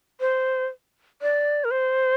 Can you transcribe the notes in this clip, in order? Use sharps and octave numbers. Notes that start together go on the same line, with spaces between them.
C5
D5
A#4
C5